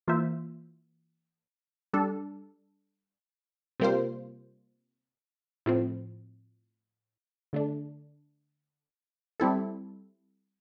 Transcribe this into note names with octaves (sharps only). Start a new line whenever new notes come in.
E3 A#3 F4 C5 E5
G3 D4 A4
C3 G3 A#3 F4 C5
A2 F3 C4
D3 A3 D4
G3 C4 E4 A4